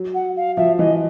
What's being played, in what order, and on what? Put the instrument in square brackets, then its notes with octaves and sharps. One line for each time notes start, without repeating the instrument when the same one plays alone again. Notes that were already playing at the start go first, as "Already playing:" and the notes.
Already playing: [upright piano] F#3
[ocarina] F#5
F5
[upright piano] F3 [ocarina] E5
[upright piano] E3 [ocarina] D#5